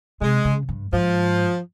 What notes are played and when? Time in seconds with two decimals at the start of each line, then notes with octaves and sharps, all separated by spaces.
0.21 C3 G#3
0.45 C#3
0.69 G2
0.93 G#2 F3